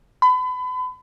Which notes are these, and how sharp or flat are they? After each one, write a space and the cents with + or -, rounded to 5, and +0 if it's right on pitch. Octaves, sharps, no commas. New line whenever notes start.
B5 +35